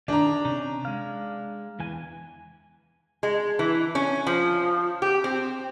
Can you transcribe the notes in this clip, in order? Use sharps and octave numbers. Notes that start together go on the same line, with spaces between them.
D#3 D4 G#4 A#5
C3 C#4 D#4
G#3 F5
E2 E3 G#5
G#3
E3
C#4
F3
G4
C4